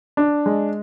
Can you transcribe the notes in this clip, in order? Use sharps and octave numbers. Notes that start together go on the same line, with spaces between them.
D4
G#3